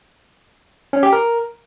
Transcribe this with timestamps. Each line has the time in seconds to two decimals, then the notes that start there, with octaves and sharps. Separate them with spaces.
0.93 C#4
1.03 G4
1.13 A#4